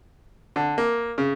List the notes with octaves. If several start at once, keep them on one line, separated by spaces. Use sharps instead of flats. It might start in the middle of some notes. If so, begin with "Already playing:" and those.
D3
A#3
C#3